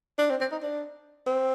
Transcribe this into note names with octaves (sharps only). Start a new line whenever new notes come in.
D4
C4
C4
D#4
D4
C4